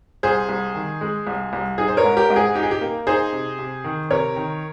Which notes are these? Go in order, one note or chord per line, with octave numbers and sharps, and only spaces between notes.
C2 G#4 C5
C2
D#3
G#3
C2
C2
D#4 G#4
C5
A#4 C#5
G#2
G4 A#4
G#2
G#4
D#4 G4
G#4
G4
A#3
D#4 G#4 C5
C3
C3
D#3
C3 A#4 C#5
D#3